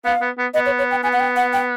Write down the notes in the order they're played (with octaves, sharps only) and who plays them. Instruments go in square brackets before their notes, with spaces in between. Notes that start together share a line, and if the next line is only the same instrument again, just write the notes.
[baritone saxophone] B3 [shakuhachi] F5
[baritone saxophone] B3
B3
[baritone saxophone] B3 [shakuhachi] D#5
[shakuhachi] C#5
C#5
G5
[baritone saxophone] B3 [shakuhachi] G#5
[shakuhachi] F#5
G5
F#5
G5